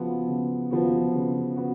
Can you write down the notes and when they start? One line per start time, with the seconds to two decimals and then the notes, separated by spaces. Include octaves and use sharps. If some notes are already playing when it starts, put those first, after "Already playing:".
Already playing: C#3 F3 B3 F#4
0.28 C#3
0.70 F3 B3 F#4
1.13 C#3
1.56 B3 F#4